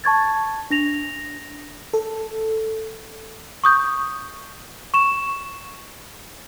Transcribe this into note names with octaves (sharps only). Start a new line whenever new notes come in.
A5 C#6 G#6 A6
D4 A#6 F7
A4
C#6 D#6 G6
C#6 E7